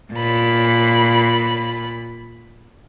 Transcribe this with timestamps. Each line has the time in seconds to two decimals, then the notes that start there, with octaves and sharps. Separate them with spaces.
0.14 A#2 B5